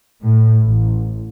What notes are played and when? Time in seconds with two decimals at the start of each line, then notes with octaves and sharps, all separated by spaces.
0.23 A2
0.64 A1